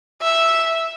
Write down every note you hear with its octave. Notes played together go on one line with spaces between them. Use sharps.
E5